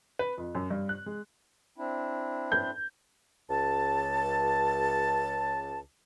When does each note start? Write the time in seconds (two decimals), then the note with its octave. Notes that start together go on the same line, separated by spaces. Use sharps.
0.19 B4
0.38 F2
0.55 F#2
0.70 G2
0.89 F#6
1.06 G#3
1.78 C4 D4 E4
2.52 G6
3.50 C#2 A5